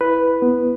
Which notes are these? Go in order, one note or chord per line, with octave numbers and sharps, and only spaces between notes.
E4 B4
B3